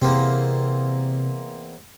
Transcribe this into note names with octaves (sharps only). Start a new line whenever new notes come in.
E2 C3 A#3 C4